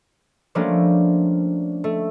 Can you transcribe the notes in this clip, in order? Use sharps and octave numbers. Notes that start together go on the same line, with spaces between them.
F3 G3 A3 A#3 C#4 D4
A3